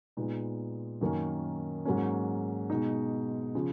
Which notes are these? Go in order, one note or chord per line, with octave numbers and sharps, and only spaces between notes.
A#2 G#3 B3 D#4
F#2 D#3 A#3 C#4
G#2 F#3 A#3 C#4
B2 G#3 D#4
C#3 F3